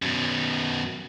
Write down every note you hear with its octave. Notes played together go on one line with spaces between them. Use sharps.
F#2 B2